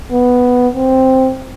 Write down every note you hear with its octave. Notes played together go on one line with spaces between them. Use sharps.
B3
C4